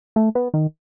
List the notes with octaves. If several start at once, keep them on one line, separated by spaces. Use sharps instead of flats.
A3
B3
D#3